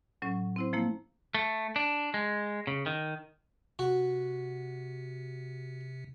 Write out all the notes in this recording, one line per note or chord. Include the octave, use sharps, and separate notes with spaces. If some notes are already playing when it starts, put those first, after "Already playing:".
A2 F#3 C#4
C4 E4 C5
F3 A3 A#3 E4
A3
D4
G#3
C#3
D#3
C3 F#4